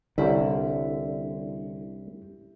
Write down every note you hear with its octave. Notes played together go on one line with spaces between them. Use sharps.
C2 D3 G3 C#4 E4 G4